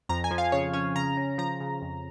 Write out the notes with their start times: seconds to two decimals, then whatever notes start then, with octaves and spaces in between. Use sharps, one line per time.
0.09 F2 A#5
0.24 G#5
0.31 F3
0.38 F5
0.52 C#3 C#5
0.73 C#4 C#5
0.96 C#3 A#5
1.17 C#4
1.38 F3 A#5
1.61 C#3
1.82 F2